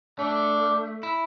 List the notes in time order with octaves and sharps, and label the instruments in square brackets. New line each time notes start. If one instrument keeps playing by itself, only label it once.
[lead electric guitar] A3 [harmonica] D4
[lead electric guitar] E4